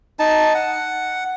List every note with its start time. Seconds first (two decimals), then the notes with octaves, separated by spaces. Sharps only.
0.19 D#4 A5
0.54 F#5